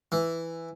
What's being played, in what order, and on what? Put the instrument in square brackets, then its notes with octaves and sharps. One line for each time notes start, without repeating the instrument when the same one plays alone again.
[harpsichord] E3